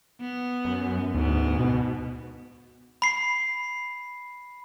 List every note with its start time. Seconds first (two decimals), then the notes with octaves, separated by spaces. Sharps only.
0.20 B3
0.65 F#2
1.14 D2 G#2 B3
1.59 B2
3.02 B5 C7